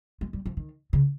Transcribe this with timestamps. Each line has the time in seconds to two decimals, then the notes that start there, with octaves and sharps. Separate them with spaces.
0.21 G#3
0.33 G3
0.46 F3
0.57 D#3
0.93 C#3